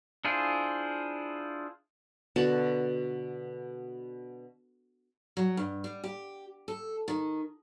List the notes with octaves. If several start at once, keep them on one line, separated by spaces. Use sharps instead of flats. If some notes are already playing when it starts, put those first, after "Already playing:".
D4 E4 F4 G#4 C5
B2 D3 F#4 A5
F#3
G2
G3
G4
A4
D#3